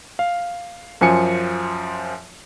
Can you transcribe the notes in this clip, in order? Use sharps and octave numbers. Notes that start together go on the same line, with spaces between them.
F5
F#2 F3 G#5 C#7